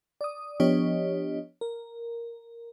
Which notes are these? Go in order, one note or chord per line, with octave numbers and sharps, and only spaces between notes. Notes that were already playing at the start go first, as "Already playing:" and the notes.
D5 D#6
F3 B3 D4 G4 C#5 D#5
A#4